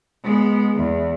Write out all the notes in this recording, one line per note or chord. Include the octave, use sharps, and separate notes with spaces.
G#3 B3
E2